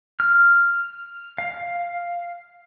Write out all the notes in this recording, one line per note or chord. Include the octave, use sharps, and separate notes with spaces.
F6
F5